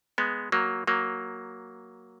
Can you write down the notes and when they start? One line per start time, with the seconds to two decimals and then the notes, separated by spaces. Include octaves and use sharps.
0.18 G#3 B3
0.52 F#3 A#3
0.87 F#3 A#3